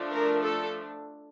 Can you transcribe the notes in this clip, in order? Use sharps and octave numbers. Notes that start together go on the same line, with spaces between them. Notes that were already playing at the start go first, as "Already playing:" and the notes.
Already playing: F3 A3 D4
A#4
A4